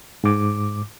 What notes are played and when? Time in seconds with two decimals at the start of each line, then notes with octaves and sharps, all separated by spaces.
0.24 G#2 D6